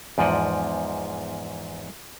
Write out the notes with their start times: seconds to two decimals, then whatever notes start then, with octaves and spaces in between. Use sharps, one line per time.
0.18 E2 G#2 F3 D5 D#5 F#5